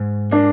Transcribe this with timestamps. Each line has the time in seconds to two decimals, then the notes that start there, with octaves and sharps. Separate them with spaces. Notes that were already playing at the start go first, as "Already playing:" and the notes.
Already playing: G#2
0.31 A#3 D4